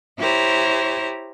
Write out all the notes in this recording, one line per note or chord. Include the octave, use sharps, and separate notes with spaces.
E4 G4 C5 C#5 A#5